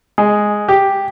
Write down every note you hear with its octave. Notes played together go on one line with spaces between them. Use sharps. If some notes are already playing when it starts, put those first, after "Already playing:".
G#3
G4